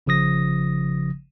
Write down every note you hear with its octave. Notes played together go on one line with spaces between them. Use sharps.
G1 C#3 F3 D#6 A#6